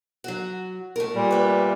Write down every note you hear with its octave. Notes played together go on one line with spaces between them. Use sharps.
F#3 F#4
A3 A#4
A#2 G3
B4 E5